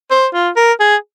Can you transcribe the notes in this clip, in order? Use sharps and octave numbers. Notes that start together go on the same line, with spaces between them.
C5
F4
A#4
G#4